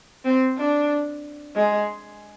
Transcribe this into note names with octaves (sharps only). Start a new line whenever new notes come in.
C4
D4
G#3